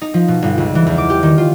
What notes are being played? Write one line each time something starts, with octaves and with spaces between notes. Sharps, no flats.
D#4
F3
B2
G1
C#2
E3
E2
D6
G4
D#3
F4